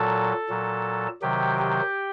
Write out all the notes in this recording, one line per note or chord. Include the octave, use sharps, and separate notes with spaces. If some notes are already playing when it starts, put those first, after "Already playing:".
Already playing: A#2 F#3 A4 A5
A#2 F#3
C3 D#3 F#3 G4 G5
G4 G5